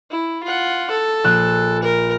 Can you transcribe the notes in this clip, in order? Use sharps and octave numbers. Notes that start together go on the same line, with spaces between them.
E4
F4 F#5
A4
A#1 F#6 E7
A#4